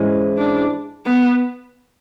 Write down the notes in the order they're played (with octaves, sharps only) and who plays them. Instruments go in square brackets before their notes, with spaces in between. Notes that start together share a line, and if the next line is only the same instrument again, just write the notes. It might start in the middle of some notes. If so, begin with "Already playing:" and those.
Already playing: [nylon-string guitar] G#2 E3 G#3 C#4 E4
[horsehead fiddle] D4
B3